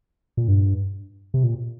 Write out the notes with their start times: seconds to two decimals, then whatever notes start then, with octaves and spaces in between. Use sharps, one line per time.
0.37 A#2
0.48 G2
1.34 C3
1.44 A#2